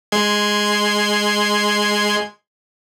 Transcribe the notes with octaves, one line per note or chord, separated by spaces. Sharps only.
G#3 C6 G#6